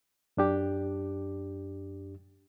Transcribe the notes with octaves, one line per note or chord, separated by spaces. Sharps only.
F#2 D4 G4